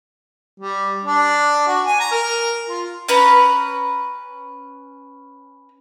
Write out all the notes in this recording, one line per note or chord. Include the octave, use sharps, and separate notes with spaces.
G3
D4
F#4
G#5
A#5
A#4
F4
C#4 B4 A#5